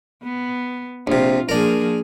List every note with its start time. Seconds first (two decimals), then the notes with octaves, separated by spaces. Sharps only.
0.22 B3
1.07 A#1 C3 F4
1.49 F3 A#3 D4 G#4 A#4